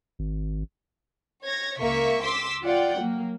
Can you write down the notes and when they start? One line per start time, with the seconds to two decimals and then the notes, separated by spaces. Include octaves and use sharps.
0.19 G#1
1.43 C#5 G#6 A#6
1.79 C#2 A#3 E5 C#6 B6
2.24 C6 D6 E6 B6
2.63 F4 D5 F#5 G5
2.99 F#3 A#3